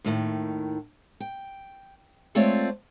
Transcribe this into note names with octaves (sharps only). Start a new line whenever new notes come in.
D#2 A2 D#3
G5
G#3 A3 C4 F4 C#5 D5